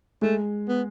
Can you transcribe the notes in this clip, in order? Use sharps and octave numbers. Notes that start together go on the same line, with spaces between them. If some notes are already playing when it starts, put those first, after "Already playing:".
G#3 A3
B3